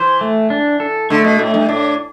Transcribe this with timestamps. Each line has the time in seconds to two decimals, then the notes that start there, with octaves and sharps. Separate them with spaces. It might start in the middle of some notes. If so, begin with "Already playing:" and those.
Already playing: E3 C5
0.21 A3
0.50 D4
0.80 A4
1.10 D3 A3
1.24 B2
1.39 A2 A3
1.54 G2
1.69 A2 D4